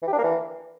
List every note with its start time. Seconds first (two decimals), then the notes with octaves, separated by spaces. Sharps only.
0.02 E3
0.07 G4
0.13 D4
0.18 A#3
0.23 E3